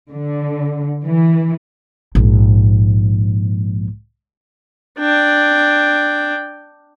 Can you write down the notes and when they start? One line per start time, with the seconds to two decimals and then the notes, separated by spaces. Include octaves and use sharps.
0.11 D3
1.04 E3
2.15 A#1 G#2
4.99 D4 G5